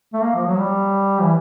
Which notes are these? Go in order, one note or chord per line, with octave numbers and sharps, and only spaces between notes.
A3
A#3
F3
F#3
G3
E3